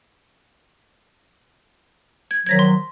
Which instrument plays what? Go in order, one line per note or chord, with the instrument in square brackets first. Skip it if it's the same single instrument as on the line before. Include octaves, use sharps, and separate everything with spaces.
[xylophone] G#6
[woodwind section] D#3 F3 F#3 [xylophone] G#6 A#6 B6
[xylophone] C6